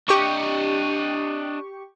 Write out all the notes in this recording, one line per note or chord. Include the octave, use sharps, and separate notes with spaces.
D4 G4 D#5 C#6